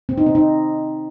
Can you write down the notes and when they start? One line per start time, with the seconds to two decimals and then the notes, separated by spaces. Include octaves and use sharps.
0.09 C4
0.18 D#4
0.26 C4
0.35 D#4